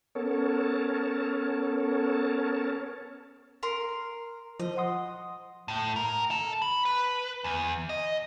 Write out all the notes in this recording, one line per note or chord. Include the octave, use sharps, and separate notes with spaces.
B3 C#4 A4 A#4 C#5 A5
A#4 C6
F3 D#5
F#5 C6 D#6
A2
A#4
A4
B5
B4
E2
D#5